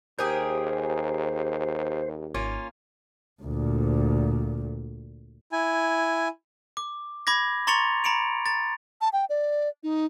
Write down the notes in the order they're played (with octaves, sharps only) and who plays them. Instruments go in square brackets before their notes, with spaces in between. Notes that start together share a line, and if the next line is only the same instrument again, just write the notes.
[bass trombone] D#2 [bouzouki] G4 G#4 A#4 [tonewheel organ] C5
[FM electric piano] G#1 [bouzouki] A#3 C#4 F4
[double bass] D2 A#2
[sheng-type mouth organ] E4 G#5
[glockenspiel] D6
B5 D6 G#6 A#6
A#5 C6 C#6 A6 C#7 F7
A#5 B5 C#7 D7 F7
A#5 A6
[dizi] A5
G5
D5
D#4